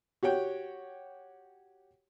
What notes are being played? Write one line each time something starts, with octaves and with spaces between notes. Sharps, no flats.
F#4 G4 C#5 G5